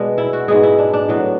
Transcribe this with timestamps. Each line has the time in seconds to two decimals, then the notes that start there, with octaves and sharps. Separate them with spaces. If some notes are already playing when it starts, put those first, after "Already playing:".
Already playing: B2 G#3 B3 D4
0.18 E4
0.33 F#4
0.48 G#2 G#3 B3 G#4
0.63 E4
0.78 D4
0.93 D4
1.08 A2 F#3 B3